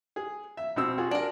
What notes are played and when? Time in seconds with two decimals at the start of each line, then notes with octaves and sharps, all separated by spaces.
0.16 G#4
0.57 E5
0.76 B2 C4 E6
0.98 F4 F#4 G#4
1.11 D4 A#4